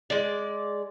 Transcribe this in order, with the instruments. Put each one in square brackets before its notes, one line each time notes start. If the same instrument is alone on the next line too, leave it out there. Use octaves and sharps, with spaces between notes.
[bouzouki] G#3 D5